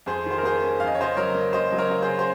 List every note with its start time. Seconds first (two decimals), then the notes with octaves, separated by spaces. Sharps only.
0.06 F2 G#4 C5
0.26 D#3 C5
0.38 A#4
0.43 A#3 G#4 C5
0.62 C#4
0.80 F2 F5
0.87 D#5
0.95 C#5
0.98 C#3 C5 D#5
1.17 F#3 A#4 C#5
1.35 A#3
1.53 C#3 C5 D#5
1.72 F#3
1.78 A#4 C#5
1.90 A#3
2.02 G#4 C5
2.08 C#3
2.19 C5